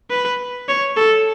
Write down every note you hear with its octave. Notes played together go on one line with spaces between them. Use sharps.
B4
C#5
A4